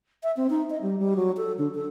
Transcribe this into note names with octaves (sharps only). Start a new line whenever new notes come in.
E5
C4
D#4
D#5
G3
G3
F#3
A4
D3
A4